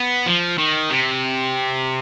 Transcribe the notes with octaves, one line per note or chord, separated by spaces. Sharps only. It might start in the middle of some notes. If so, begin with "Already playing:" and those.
Already playing: B3
F3
D#3
C3